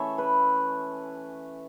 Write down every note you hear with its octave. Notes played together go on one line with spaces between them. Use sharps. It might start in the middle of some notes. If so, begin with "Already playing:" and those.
Already playing: E3 A3 C#4 A4 C#5 E5
B4